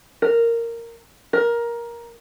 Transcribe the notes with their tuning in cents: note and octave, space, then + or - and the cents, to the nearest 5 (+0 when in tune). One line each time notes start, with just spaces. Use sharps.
A#4 -10
A#4 +15